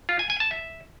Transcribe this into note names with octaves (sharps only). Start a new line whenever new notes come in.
F4
G#5
G#5
A5
E5